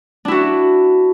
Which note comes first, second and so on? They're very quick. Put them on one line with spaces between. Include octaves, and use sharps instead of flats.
D4 E4 F#4